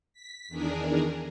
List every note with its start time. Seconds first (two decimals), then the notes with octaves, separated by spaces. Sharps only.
0.13 B6
0.48 E2 D#3 D4 G#4 A#4